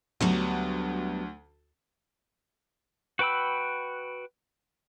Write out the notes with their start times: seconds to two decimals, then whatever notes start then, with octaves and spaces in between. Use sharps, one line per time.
0.21 D2 F#3 G3 B3
3.19 F#4 B4 G5 B5 E6